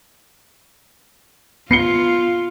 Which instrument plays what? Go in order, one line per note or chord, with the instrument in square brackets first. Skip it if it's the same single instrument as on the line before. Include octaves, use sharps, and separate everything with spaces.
[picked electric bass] B3 [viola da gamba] F4 [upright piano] C7 C#7 G7